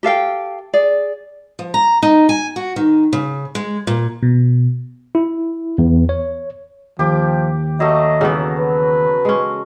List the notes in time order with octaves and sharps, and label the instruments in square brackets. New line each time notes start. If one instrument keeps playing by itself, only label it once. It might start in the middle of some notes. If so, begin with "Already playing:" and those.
[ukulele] G4 A4 F5 G5
G#4 D5
[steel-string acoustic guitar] F3
A#5
D#4
G#5
F#4
D#3
C#3
G#3
A#2
[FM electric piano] B2
[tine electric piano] E4
E2
C#5
[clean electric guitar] D#2 [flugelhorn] F3 [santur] G4 D6
[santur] F#3 A3 [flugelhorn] D#5
[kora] C#3 E3 B3 [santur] F#3
[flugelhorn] B4
[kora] G#3 C#4